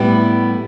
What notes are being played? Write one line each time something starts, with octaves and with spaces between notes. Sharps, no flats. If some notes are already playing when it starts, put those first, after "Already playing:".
Already playing: A2 G3 B3 E4